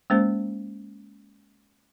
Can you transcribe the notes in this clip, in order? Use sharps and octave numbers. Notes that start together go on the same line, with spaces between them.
G#3 A#3 C#4 C5